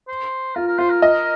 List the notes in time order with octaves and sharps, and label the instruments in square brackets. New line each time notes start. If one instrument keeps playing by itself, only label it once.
[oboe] C5
[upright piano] F4 [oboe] A#4
[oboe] A#4
[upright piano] F4 [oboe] C5
[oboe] A#4
[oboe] A#4 [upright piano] D#5